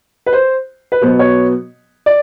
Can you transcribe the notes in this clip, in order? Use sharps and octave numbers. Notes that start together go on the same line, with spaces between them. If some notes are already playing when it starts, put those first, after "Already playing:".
B4
C5
B4
B2 F#3 B3 C5
C#5
D5